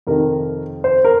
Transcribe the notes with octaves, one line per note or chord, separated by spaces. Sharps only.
F2 C3 D#3 A#4
C5
A#4